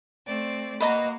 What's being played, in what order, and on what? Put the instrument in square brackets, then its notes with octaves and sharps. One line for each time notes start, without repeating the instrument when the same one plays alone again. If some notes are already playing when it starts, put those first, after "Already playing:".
[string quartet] A3 C4 D5
[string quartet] A#3 F#4 [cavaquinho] B4 D#5 A#5